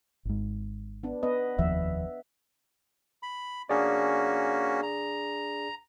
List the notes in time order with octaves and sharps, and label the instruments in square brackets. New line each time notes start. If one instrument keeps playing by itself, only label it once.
[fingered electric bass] G#1 G#2
[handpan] B3 D4
B3 B4 D#5
[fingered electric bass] F1 D#2 F3 [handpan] E5
[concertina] B5
[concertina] A#3 C#4 F#4 [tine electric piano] D4 G#4 D5
[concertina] A#5